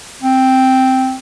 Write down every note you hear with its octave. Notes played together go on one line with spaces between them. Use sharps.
C4